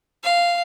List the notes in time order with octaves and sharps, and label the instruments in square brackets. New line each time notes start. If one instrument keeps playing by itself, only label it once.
[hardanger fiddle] F5